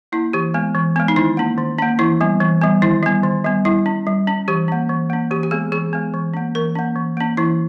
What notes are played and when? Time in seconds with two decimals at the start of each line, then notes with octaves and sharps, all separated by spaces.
0.12 A#3 C#4 E4
0.33 E3 G4
0.54 G#3 B3
0.75 E3
0.96 G#3 B3
1.08 D#4
1.16 D#3 E4
1.37 A#3 C#4
1.58 D#3
1.78 A#3 C#4
1.99 E3 E4
2.21 G3 B3
2.41 E3
2.61 G3 B3
2.82 D#3 E4
3.03 G3 B3
3.23 D#3
3.44 G3 B3
3.65 G3 E4
3.86 C#4
4.07 G3
4.27 C#4
4.48 E3 G4
4.68 A#3 C#4
4.89 E3
5.10 A#3 C#4
5.31 E3 G4
5.43 G4
5.51 G#3 B3 G#4
5.72 E3 G#4
5.93 G#3 B3
6.14 E3
6.34 A#3 C#4
6.55 E3 A#4
6.75 A#3 C#4
6.96 E3
7.17 A#3 C#4
7.37 E3 E4